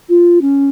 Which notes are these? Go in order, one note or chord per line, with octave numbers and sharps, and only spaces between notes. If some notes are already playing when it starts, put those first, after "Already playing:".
F4
C#4